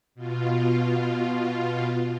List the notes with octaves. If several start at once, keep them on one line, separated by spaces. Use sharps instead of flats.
B2 F4